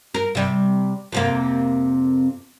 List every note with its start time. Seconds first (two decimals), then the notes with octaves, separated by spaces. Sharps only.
0.14 A#4
0.35 C3 G3
1.12 F2 C3 A#3